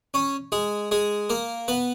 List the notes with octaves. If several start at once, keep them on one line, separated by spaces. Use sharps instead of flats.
C#4 C#5
G#3 G#4
G#3 G#4
A#3 A#4
B3 B4